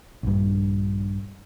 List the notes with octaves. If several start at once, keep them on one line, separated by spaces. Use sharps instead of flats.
A#1 G2